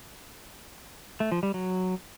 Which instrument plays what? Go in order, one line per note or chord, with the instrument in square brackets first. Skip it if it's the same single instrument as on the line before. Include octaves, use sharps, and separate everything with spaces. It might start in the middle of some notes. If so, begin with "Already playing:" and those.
[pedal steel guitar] A3
F3
G3
F#3